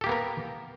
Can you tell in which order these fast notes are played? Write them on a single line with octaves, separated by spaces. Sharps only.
A4 G4 A#3 B3 A#4